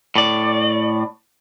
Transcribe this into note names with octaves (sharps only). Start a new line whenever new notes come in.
A2 D5